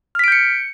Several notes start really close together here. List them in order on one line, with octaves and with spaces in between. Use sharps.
F6 B6 D7 G6 C#7